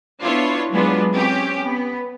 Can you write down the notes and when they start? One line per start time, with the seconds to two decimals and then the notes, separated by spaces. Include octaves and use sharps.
0.22 B3 D4 E4 F4 C#5
0.72 F#3 G#3 B3 D4 F4 B4
1.12 C4 C#4 G4
1.62 B3